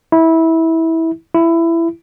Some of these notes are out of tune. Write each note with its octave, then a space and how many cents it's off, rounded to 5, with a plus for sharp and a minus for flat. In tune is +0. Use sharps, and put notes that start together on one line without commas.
E4 -20
E4 +15